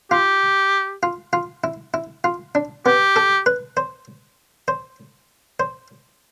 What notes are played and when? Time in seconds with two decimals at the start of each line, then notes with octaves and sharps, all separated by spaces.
0.11 F4 G4
1.03 F4
1.33 F4
1.64 E4
1.94 E4
2.24 F4
2.55 D4
2.86 B3 G4
3.16 A4
3.46 B4
3.77 C5
4.68 C5
5.60 C5